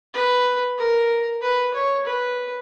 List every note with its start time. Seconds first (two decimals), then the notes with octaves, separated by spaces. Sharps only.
0.14 B4
0.78 A#4
1.42 B4
1.74 C#5
2.06 B4